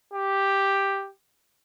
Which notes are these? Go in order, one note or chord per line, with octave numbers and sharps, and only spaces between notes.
G4